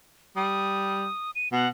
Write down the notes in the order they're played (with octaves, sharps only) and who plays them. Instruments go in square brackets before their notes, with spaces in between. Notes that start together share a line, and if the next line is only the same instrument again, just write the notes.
[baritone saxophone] G3 [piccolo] D#6
[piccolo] D#7
[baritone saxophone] B2 [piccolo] F#5